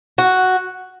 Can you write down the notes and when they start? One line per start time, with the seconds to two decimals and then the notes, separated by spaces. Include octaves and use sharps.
0.18 F#4